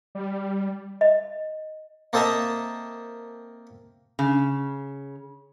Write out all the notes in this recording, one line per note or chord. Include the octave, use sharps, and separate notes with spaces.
G3
D#5
A#3 C4 A4 D#5 E5 A#5
C#3